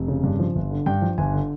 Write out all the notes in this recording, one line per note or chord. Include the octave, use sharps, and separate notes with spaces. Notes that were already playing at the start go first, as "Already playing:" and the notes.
Already playing: F1
C#3
G2
F3
G1
D3
G2 G5
F3
G1 G#5
D3